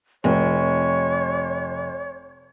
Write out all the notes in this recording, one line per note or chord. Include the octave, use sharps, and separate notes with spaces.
F1 C#5